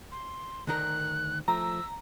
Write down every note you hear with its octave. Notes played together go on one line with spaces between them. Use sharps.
C6
D2 D#3 A#4 F#6
F3 A3 A#5 E6